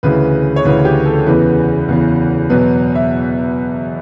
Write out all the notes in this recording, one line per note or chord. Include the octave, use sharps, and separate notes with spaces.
D2 C#3 E3 B4
C#5
D2 C#3 E3 B4
G4
A4
E2 C#3 E3 B4
E2 C#3 E3
E2 B2 F#3 B4
E5